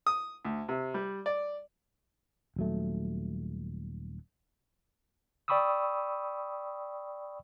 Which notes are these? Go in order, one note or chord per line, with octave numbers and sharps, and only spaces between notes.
D#6
D2
C3
G3
D5
D#1 F#3 A3
D5 G5 B5 C#6 D#6 E6